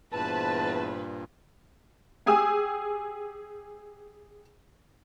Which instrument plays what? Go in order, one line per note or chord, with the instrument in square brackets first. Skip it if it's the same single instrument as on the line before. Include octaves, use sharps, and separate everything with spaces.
[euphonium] E2 [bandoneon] G2 A#2 [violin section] B4 C5 [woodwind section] A5
[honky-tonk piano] G4 G#4 G#5 D#6 E6